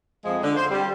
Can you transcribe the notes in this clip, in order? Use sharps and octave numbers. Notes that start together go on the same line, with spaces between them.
F2 F3 G#3
D3
C5
G3